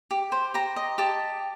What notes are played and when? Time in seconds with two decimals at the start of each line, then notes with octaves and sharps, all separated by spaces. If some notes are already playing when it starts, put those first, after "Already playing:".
0.11 G4
0.32 C5
0.54 G4 A#5
0.76 D#5
0.98 G4 A5